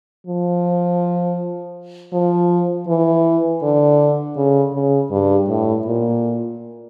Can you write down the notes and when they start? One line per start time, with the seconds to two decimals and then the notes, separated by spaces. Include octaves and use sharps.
0.27 F3
2.13 F3
2.88 E3
3.62 D3
4.36 C#3
4.74 C#3
5.11 G2
5.49 A2
5.86 A#2